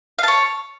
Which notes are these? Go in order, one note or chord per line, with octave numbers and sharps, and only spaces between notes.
C#5 F5 A5